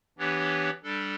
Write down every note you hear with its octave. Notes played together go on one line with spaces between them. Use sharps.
E3 B3 D4 G4 C#5
G3 D4 A4